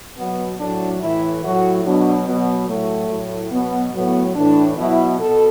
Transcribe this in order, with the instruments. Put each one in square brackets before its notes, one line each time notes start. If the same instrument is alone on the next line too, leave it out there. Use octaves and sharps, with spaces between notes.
[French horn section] B2 F#3 B3
A2 F#3 D4
A2 E3 E4
A2 F#3 F#4
B2 F#3 D4
B2 F#3 B3
A2 F#3 A3
A2 F#3
B2 F#3 B3
A2 F#3 B3
A2 E3 D4
B2 F#3 E4
B2 A4